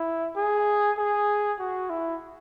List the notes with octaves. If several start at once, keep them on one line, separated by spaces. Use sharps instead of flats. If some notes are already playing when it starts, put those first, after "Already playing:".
Already playing: E4
G#4
G#4
F#4
E4